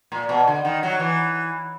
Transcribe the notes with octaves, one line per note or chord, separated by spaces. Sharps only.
A#2
B2
D3
D#3
F#3
E3